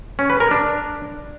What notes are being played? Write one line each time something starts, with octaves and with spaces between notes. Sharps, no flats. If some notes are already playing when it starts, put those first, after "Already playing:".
C#4
B4
A#4
D4